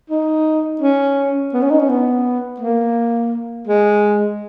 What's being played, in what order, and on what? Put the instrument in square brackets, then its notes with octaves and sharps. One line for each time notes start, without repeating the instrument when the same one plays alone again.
[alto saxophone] D#4
C#4
B3
C#4
D#4
C#4
B3
A#3
G#3